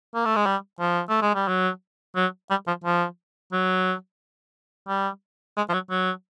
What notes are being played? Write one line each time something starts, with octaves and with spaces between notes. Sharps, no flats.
A#3
A3
G#3
G3
F3
A3
G#3
G3
F#3
F#3
G3
F3
F3
F#3
G3
G#3
F3
F#3
F#3